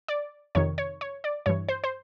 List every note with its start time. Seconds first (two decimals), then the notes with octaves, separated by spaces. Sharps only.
0.08 D5
0.55 F2 C3 D#3 C#5
0.78 C#5
1.01 C#5
1.24 D5
1.46 G2 E3 C#5
1.69 C5
1.84 C5